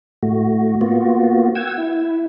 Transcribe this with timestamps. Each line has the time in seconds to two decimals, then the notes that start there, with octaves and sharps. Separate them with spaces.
0.23 A2 A3 F#4
0.81 A#3 B3 F4 F#4
1.55 F#5 G5 E6 G#6
1.78 E4